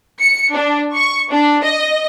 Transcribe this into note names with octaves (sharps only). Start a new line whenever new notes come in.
C#7
D4
C#6
D4
D#5